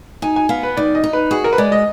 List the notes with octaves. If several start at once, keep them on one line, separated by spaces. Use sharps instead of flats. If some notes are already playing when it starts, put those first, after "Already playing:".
D#4 G#5
G#5
B3 F5
B4
D#3 D5
D#5
D#4
B4
F#4 G#4
A#4
B4
G#3 D5
D#5